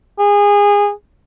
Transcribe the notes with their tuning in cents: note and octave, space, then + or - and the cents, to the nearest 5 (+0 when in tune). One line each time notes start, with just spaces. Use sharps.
G#4 -25